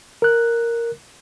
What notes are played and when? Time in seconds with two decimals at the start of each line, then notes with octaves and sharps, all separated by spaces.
0.22 A#4 F#6